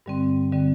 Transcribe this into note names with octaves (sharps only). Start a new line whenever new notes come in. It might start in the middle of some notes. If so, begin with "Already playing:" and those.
G2 D3 G3 C4
D3 G3 C4